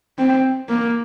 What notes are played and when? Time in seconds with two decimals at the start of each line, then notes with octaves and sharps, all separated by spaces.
0.18 C4
0.69 A#3